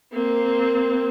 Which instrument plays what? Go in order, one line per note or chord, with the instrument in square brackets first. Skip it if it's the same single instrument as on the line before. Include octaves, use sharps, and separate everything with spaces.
[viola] A#3 C4